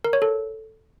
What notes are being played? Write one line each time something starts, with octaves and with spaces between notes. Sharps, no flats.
A#4
C#5
A4